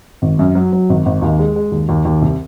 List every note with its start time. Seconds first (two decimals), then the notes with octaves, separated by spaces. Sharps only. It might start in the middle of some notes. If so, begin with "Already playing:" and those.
0.22 G#1
0.39 F#2
0.55 F#3
0.73 F#3
0.89 G#1
1.06 G#1
1.22 D#2
1.39 G#3
1.56 G#3
1.72 D#2
1.89 D#2
2.05 D#2
2.22 C2